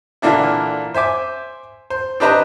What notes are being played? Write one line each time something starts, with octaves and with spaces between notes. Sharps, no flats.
A#2 D3 E3 A#3 D4 E4
C5 E5 G#5 D6
C5
C4 D4 G4 B4 D#5 A#5